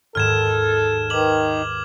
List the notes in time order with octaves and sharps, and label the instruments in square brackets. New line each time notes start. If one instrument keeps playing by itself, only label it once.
[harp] D#2 G#2 [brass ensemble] A4 [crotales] F6 G#6 E7
[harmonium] D#3 [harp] B4 [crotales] D6 F#7